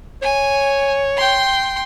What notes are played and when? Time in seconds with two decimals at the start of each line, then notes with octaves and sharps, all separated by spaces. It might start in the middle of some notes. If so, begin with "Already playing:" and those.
0.22 C#5 G#5
1.17 G5 C6